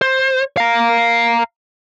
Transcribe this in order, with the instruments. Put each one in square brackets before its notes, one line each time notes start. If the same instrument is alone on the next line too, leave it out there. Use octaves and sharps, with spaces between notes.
[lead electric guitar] C5
F5 A#5